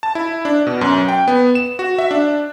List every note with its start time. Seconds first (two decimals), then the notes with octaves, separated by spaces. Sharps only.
0.03 A5
0.15 E4
0.45 D4
0.67 B2
0.81 F#2
1.09 G5
1.28 B3
1.55 E7
1.79 F#4
1.99 E5
2.11 D4